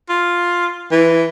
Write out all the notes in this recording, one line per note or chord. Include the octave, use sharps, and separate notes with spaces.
F4
E3